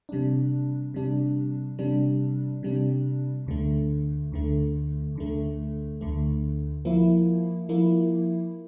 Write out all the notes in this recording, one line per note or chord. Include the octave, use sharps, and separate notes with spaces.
C3 G3 D4
C3 G3 D4
C3 G3 D4
C3 G3 D4
D2 D3 A3
D2 D3 A3
D2 D3 A3
D2 D3 A3
F3 A#3 E4
F3 A#3 E4